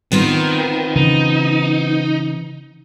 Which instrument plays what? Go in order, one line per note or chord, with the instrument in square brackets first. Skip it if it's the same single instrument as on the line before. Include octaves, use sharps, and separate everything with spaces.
[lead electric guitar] D#3 [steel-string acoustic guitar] B3 C4 F4
[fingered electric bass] C#3 E3 [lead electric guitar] D#4